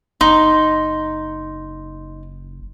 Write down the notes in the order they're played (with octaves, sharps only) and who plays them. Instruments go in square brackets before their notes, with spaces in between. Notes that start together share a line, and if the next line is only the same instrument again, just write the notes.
[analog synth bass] F#1 [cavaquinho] D#4 [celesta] C6